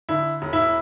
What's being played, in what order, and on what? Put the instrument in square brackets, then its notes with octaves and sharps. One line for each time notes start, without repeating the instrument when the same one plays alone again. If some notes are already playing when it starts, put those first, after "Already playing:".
[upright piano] D3 E4
E1
E4